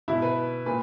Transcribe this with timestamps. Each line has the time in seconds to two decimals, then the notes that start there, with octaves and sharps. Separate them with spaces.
0.08 B2 E4
0.22 B4
0.66 A#2 B4